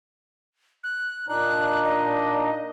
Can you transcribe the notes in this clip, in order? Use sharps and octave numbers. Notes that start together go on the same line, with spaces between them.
F#6
A#2 D4 D#4 F#6
D#5